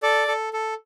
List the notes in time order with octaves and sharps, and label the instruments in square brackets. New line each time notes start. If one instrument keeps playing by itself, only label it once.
[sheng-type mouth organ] A4 D5
A4
A4